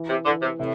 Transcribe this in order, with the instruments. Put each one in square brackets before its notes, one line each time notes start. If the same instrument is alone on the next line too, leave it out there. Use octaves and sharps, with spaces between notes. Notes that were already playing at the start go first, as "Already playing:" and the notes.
Already playing: [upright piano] E3
[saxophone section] C3
[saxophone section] D3 [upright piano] E3
[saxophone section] C3
[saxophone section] A2 [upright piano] C3